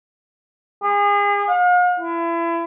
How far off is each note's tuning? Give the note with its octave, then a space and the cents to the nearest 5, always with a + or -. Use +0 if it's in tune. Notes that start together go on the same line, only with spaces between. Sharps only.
G#4 -35
F5 +40
E4 +30